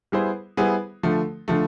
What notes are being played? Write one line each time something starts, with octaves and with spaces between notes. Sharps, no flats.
G3 B3 E4 G#4 C5
G3 B3 E4 G#4 C5
D3 F3 A3
D3 F3 A3